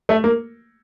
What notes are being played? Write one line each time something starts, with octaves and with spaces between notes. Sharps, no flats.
A3
A#3